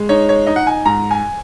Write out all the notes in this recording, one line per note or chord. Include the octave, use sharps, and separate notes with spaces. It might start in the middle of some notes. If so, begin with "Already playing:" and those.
Already playing: G#3
D#4 C#5
C#5
D#4 D#5
F#5
G#5
G#2 A#5
G#5